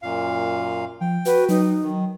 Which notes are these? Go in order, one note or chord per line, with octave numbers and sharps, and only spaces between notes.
F#2 A#2 F5
F3 G5
F#4 B4
F#3 D#4
D#3